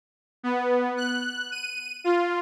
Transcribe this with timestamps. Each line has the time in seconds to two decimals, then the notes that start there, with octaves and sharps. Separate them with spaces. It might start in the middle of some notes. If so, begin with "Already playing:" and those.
0.43 B3
0.97 F#6
1.52 D#7
2.04 F4